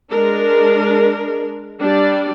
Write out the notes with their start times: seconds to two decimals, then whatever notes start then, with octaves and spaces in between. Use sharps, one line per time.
0.10 G#3 D4 A#4
1.81 G3 D4 D5